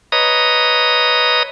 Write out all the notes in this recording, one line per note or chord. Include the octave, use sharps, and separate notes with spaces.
B4 C#5 D#5 A#5 D#6